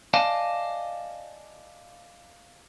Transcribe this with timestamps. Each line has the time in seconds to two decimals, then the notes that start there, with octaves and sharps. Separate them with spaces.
0.14 D5 D#5 F5 G#5 A5